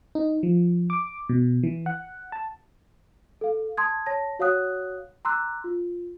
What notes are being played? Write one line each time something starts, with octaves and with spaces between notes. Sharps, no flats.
D#4
F3
D6
B2
E3
F#5
A5
A4 F5
A5 C6 D#6 G#6
C#5 A5 A#6
F#4 C#5 F5 F#5 D#6 F#6
A#5 C6 D6 E6 F#6
F4